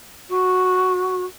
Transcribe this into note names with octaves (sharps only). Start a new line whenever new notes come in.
F#4